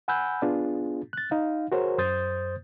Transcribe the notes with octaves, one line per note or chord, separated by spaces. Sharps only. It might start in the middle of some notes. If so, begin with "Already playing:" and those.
F#5 G#5 B5 E6 F#6 G6
B3 D4 F4 G#4
F#6 A6
D#4 F5
F#4 G#4 A#4 C5 C#5
F#2 C5 D#6 G6 A6